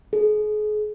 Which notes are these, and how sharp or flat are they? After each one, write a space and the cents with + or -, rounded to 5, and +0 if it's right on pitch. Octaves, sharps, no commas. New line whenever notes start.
G#4 +35